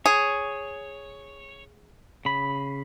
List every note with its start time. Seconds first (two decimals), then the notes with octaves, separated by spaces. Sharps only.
0.06 G#4 C#5
2.25 C#3 B5